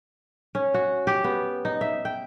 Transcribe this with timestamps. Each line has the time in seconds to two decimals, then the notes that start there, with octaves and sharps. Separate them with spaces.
0.55 C#4
0.74 F#4
1.07 G4
1.24 B3
1.65 D#4
1.81 E5
2.05 G5